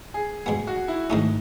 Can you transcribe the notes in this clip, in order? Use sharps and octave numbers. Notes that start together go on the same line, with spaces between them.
G#4
B2 G#3 B3 G#4
F#4
E4
G#2 D#3 A3 C#4 D#4